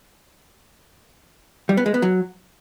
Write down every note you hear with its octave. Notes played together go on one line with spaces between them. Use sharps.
G3
B3
G#3
B3
F#3